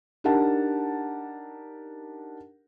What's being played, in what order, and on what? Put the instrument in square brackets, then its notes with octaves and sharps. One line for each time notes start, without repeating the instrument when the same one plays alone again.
[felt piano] D4 D#4 G4 A#4 F#5 A5